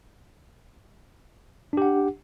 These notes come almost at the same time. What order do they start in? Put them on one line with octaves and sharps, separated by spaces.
D4 G4 F#5